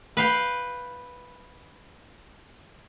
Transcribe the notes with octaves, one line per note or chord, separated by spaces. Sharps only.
B4 F5 G5